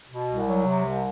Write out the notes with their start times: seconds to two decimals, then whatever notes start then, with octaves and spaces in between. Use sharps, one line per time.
0.09 B2
0.28 C2
0.46 F#3
0.65 C3
0.84 C2